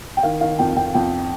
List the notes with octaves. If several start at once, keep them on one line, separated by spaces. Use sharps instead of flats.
G5
D#3 F5
D#3 F5
F2 G5
F2 G5
F2 G5